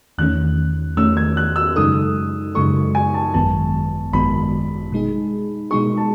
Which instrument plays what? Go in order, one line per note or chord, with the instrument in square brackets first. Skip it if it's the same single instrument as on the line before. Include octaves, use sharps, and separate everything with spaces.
[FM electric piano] E2 D#3 A3 C#4 [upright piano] F#6
[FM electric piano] E2 D#3 A3 C#4 [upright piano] E6
[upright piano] G#6
F#6
E6
[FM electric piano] F#2 C#3 G#3 D#4 A4 [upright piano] D#6
[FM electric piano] F#2 C#3 G#3 D#4 A4 [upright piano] C#6
[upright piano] G#5
A5
[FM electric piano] G#1 F#2 D#3 G#3 B3 [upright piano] A5
[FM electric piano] G#1 F#2 D#3 G#3 B3 [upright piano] B5
[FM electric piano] B2 G#3 D#4 G#4
[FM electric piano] B2 G#3 D#4 G#4 [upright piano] C#6
[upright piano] A5